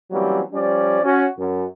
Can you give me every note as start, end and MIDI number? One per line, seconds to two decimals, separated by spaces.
0.11 0.41 52
0.11 0.41 54
0.11 0.41 55
0.11 0.41 58
0.11 0.41 60
0.11 0.41 61
0.53 1.01 53
0.53 1.01 55
0.53 1.01 61
0.53 1.01 74
1.03 1.26 61
1.03 1.26 66
1.38 1.64 42